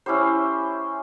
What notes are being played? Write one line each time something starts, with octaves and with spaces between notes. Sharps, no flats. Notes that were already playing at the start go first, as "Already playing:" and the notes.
C#4 E4 G4 C5